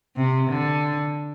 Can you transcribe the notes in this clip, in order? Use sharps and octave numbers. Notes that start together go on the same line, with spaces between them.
C3
D3